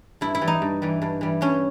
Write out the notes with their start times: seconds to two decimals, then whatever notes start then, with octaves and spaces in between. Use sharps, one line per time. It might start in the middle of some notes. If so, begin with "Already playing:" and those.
0.21 G2 E4
0.35 E4
0.41 E3 G3
0.48 D#4
0.62 G2
0.82 E3 G3
1.02 G2
1.21 E3 G3
1.41 G2 C#4